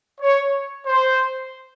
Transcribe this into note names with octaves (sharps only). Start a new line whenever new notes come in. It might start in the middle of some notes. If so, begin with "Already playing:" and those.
C#5
C5